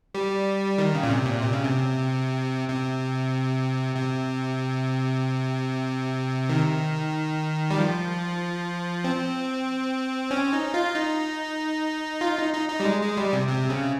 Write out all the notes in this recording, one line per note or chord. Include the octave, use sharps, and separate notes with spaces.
G3
D#3
C#3
A#2
C3
A#2
C3
C#3
C3
C3
C3
D#3
G3
F3
C4
C#4
D#4
F4
D#4
F4
D#4
D#4
D#4
G3
G#3
G#3
G3
C3
C3
C#3